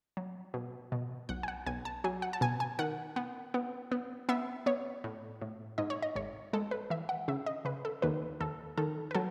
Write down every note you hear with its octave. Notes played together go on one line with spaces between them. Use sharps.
F#3
B2
B2
B1 F#5
G#5
F#5
B1 G#5
A5
F#3 G#5
F#5
A5
B2 G#5
G#5
D#3 F#5
B3
B3
B3
B3 E5
B3 C#5
A2
A2
G#2 D#5
C#5
D#5
G#1 C#5
G#3 A4
B4
E3 E5
F#5
C#3 E5
D#5
C#3 B4
A4
D#2 B4
D#2 A4
D#3 A4
B4
F#3 A4